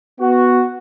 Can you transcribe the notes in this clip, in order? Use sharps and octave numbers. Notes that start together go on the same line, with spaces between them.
B3 F#4